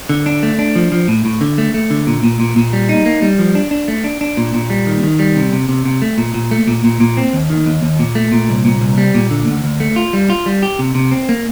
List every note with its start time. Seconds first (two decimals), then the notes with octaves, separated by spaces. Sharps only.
0.09 D3
0.26 D4
0.43 A3
0.59 D4
0.76 F3
0.92 F3
1.08 A2
1.25 A2
1.41 D3
1.58 A3
1.74 A3
1.90 D3
2.07 A#2
2.24 A#2
2.40 A#2
2.56 A#2
2.73 G3
2.89 D#4
3.06 A#3
3.22 G3
3.39 F3
3.55 D4
3.71 D4
3.88 A3
4.04 D4
4.21 D4
4.37 A#2
4.54 A#2
4.70 G3
4.87 D#3
5.03 D#3
5.19 G3
5.36 C3
5.53 C3
5.69 C3
5.85 C3
6.02 A3
6.18 A#2
6.34 A#2
6.51 A3
6.68 A#2
6.84 A#2
7.01 A#2
7.17 C4
7.33 D#2
7.50 D#3
7.66 D#2
7.83 D#2
7.99 A#2
8.15 A3
8.32 A#2
8.49 C2
8.65 A#2
8.81 C2
8.98 G3
9.14 A#2
9.31 D3
9.47 D2
9.64 D2
9.80 A3
9.96 F4
10.13 G3
10.30 F4
10.46 G3
10.63 G4
10.79 C3
10.95 C3
11.11 C4
11.29 A#3